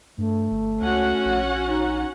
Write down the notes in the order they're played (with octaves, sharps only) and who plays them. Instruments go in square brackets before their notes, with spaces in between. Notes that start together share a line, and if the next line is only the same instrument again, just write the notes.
[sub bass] G2 [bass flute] A3
[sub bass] G1
[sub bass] C#2 [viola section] C#4 F#4 F#5
[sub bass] A#1
[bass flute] D#4